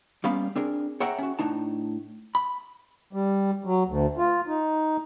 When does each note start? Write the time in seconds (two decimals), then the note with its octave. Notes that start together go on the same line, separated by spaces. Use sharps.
0.24 G3 A#3 B3 C#4 F5 B5
0.56 C4 D4 G#4 A#4
1.00 G#4 C#5 E5 F#5 G5 A#5
1.18 C#4 F#4
1.39 A2 D4 D#4 A5
2.35 B5
3.13 G3
3.65 F#3
3.88 D2
4.18 F4
4.47 D#4